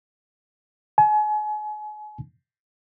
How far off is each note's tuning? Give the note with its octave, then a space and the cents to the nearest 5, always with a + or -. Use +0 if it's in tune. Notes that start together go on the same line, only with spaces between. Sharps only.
G#5 +35